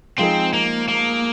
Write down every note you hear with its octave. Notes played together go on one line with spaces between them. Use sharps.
F3 G#3 C4 D#4 G#4
A#3
A#3